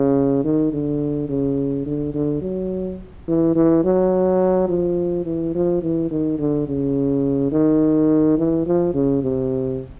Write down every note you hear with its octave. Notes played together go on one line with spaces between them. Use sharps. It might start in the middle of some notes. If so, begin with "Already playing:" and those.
Already playing: C#3
D#3
D3
C#3
D3
D3
F#3
E3
E3
F#3
F3
E3
F3
E3
D#3
D3
C#3
D#3
E3
F3
C#3
C3